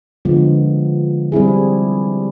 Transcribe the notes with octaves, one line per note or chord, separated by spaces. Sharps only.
D3 F3 G#3 B3
G3 C4 E4 G#4